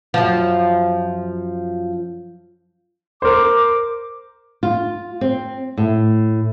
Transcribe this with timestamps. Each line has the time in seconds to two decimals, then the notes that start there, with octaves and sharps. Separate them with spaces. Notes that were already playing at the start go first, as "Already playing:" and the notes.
0.14 F#2 F3
3.22 A#4 C5 D6
4.63 F4
5.21 C4
5.78 A2